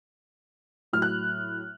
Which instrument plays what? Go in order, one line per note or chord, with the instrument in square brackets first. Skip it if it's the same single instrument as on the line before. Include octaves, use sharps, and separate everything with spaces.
[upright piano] A2 F#3 F6
F#6